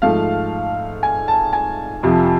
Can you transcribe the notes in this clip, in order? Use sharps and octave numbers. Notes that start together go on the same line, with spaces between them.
G#2 F3 A3 F5
G#5
A5
G#5
F2 C3 F3